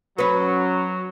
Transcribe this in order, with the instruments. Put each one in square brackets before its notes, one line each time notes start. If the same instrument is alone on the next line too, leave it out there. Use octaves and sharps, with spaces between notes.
[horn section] F#3 [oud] C#4 B4